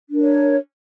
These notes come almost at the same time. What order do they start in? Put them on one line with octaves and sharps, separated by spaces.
D4 A#4 C#5